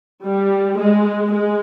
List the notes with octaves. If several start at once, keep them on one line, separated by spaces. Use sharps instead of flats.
G3
G#3
G#3